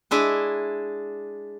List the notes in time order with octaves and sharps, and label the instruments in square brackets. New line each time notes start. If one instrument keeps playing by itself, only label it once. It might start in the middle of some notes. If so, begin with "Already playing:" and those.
[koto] G#3 D4 E4 G#4